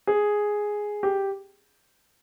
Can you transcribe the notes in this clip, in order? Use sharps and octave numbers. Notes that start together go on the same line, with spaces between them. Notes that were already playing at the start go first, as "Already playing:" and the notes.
G#4
G4